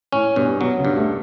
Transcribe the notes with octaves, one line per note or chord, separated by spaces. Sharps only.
A2 C#4
G2 B2
B2 F#3
C#3
G2
A3